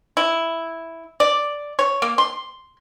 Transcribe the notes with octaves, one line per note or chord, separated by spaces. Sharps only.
E4
D5
C#5
A#3
C6